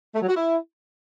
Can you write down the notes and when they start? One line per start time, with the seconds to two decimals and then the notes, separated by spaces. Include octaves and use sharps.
0.15 A3
0.22 F#3
0.29 F#4
0.36 E4